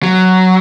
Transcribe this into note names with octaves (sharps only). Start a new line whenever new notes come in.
F#3